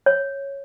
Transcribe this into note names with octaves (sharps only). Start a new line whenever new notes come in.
C#5